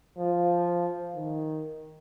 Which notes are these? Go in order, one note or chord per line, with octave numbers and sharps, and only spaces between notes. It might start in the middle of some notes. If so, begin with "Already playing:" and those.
F3
D#3